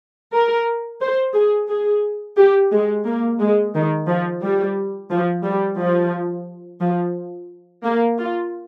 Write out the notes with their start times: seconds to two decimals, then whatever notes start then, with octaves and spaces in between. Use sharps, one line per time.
0.33 A#4
1.01 C5
1.35 G#4
1.69 G#4
2.37 G4
2.72 G#3
3.05 A#3
3.40 G#3
3.74 D#3
4.08 F3
4.43 G3
5.11 F3
5.44 G3
5.78 F3
6.81 F3
7.84 A#3
8.18 F4